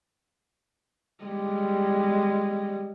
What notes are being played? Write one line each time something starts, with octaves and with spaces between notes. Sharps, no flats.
G3 G#3